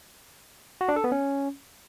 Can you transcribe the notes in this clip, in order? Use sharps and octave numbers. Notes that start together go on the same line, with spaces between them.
F#4
D4
A4
B3
C#4